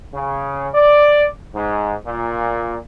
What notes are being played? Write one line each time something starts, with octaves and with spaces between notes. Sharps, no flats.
C#3
D5
G#2
A#2